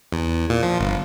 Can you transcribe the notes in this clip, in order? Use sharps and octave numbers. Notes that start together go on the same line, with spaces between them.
E2
A#2
F3
G1